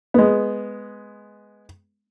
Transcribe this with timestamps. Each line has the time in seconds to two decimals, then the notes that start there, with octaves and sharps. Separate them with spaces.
0.14 G#3 B3